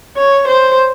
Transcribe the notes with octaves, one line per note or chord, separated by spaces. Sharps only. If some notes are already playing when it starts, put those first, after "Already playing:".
C#5
C5